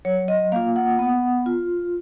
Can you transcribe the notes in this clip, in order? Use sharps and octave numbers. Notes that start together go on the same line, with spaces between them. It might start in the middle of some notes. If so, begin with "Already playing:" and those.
F#3 C#5
D#5
A#3 F4 F5
F#5
B3
F4